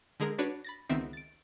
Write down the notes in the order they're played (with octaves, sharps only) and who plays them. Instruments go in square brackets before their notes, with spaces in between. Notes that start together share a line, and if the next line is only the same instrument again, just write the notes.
[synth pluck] D3 G#3 G#4 A#4
D4 F#4 B4 C#5
B5 A6 A#6
C#2 D#3 B3 C4 E5
A6 D7